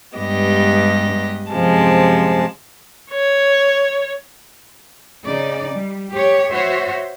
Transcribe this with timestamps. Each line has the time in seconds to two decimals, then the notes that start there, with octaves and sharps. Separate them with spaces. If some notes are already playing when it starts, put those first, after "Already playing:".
0.18 G2 G#3 B3 G4 D#5
1.52 F#2 C3 F3 G#3 A5
3.10 C#5
5.26 C#3 D#4 D5
5.74 G3
6.12 G4 C#5
6.50 F#4 C5 C#5 E5